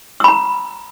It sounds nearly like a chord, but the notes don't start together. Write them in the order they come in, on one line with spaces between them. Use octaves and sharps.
E6 B5 A#5